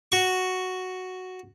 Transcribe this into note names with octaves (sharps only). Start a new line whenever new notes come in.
F#4 C#6